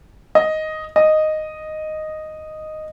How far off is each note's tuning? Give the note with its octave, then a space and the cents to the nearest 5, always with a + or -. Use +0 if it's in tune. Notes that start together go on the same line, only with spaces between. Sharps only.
D#5 +5
D#5 -5